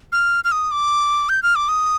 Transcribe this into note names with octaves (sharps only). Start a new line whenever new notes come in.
F6
F6
D#6
D6
G6
F6
D6
D#6